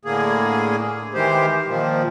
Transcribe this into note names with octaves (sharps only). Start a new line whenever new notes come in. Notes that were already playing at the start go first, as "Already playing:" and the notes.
A2 D3 A#3 G#4
D#3 E3 G#3 G4 C5
A#2 D#3 F3